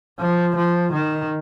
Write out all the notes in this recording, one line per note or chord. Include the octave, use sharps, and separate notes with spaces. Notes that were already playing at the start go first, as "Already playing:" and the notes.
F3
F3
D#3